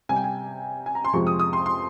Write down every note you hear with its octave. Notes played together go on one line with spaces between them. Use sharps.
C3 G3 G#5
G5
G#5
G#5
A#5
C6
F2 C3 F3 G#3 C#6
D#6
D#6
C6
C6